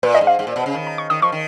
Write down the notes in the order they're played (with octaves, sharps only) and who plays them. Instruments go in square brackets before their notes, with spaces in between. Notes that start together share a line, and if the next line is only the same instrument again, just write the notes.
[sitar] A#2 [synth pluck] B4
[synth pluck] D#5
[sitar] G#2
[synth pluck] F5
[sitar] G#2
A#2
B2
C#3
D#3
[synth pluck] A#5
C#6
[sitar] D#3 [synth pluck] D#6
[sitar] F3 [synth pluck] C#6
[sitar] D#3